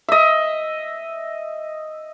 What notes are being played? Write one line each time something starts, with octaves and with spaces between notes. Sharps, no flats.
D#5 E5